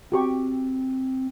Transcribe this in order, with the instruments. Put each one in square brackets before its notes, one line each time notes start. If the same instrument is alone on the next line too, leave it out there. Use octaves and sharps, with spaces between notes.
[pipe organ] C4 [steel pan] F#4 G4 C#6